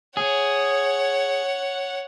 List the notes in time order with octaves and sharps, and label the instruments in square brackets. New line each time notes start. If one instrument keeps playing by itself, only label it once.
[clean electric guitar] G#4 [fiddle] C#5 F#5